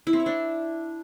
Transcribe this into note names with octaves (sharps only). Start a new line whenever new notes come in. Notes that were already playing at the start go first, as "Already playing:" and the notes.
E4
C4
C#5
D4